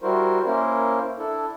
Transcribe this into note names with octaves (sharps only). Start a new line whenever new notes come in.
G3 E4 F#4 A#4 C5
A#3 C#4 E4 A#4 C5
D4 E4 A4